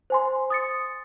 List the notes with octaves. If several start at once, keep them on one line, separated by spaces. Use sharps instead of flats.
C5 G#5 C6
D#6 A6 C#7